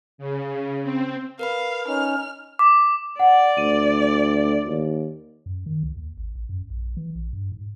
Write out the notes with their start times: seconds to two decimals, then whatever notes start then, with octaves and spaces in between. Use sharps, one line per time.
0.18 C#3
0.83 C4
1.39 A#4 B4 F5 B5
1.88 C#4 D#4 F6
2.59 D6
3.19 D5 F#5
3.57 D2 D#7
4.67 D#2
5.46 F#2
5.66 D#3
5.83 C#2
5.97 D#2
6.17 G#1
6.35 A1
6.49 F#2
6.69 A#1
6.97 E3
7.15 A#1
7.33 G2
7.52 G#2